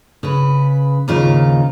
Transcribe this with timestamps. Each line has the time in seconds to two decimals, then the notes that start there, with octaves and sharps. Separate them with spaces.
0.23 C#3 B4
1.08 D#2 G#2 C#3 D#4 F4